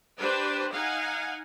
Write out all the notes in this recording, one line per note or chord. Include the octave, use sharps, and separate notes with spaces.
D4 G4 B4 C5
D#4 F5 F#5 G#5